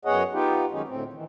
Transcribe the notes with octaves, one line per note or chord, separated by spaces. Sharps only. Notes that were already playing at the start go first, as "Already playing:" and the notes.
F#2 B3 G#4 C#5 D#5 F#5
B3 D#4 F4 G4
F#2 D#3 G#3 C#4 D#4
D2 A2 C4
D#3 E3